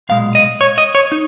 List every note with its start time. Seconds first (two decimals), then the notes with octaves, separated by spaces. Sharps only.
0.09 B1 A#2 G#3 F5
0.35 D#5
0.61 C#5
0.78 D#5
0.95 C#5
1.12 D#4